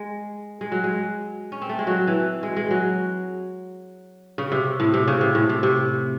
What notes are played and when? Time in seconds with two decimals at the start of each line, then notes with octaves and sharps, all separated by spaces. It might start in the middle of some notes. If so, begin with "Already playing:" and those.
Already playing: G#3
0.61 G#3
0.72 F#3
0.84 G#3
1.52 C#4
1.62 C4
1.69 A3
1.79 G#3
1.87 F#3
2.07 E3
2.43 G#3
2.56 G#3
2.71 F#3
4.38 C#3
4.52 C3
4.80 A2
4.94 C3
5.08 C#3
5.21 C3
5.35 A2
5.49 C3
5.63 C3